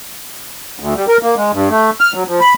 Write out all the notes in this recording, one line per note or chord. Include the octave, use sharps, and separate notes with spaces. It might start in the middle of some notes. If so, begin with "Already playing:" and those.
D2
G3
A#4
A#3
G#3
G2
A3
F6
F#3
F3
B5